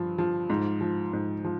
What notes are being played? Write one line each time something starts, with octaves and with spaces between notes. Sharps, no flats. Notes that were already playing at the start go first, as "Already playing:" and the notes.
Already playing: G2 F3
F3
G#2
F3
G#2
F3